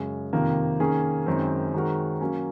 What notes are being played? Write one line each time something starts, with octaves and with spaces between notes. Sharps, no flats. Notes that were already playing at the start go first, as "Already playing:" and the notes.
Already playing: F#2 C#3 G#3 C#4
F2 C3 D#3 A#3
D#3 A#3 C#4 G#4
F#2 D#3 G#3 C4
D#3 G#3 C4 F#4 A#4
F#3 A#3 C#4